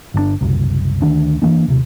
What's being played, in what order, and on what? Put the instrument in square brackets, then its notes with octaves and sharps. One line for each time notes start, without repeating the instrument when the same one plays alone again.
[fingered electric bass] G1 C3 D4
F#1 C2
D2 D#3 F3 D4
E3 F3 A#3 D4
D#1 C3